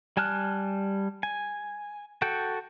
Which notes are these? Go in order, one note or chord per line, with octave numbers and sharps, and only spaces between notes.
G3 G#5 A5 F6 F#6
G#5
F#4 A4 G5